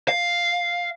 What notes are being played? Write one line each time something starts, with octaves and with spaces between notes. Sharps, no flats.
F5